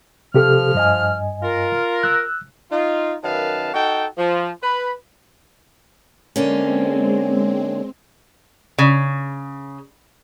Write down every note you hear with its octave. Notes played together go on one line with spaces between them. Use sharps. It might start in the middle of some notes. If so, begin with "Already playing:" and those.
C3 F3 G4 A4 F6
G2 D#5 G#5
F4 A#4
E6 F#6
D#4 F4
F#2 D#3 B4 F5 A5
D#4 F#4 A4 G5
F3
B4 B5
D3 G#3 A#3 C4 C#4
C#3